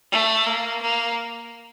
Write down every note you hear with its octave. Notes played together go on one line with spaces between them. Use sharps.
A3
A#3
A#3